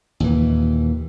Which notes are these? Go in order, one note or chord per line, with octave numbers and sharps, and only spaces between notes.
D#2 A#2 E3